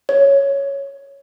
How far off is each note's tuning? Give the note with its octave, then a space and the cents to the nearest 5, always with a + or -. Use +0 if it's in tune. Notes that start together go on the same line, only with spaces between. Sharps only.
C#5 +0